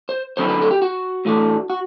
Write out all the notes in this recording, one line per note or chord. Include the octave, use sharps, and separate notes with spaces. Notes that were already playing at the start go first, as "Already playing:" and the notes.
C5
D3 F#3 C4 E4 C5
B4
A4
G4
F#4
A2 E3 A3 D4
F#4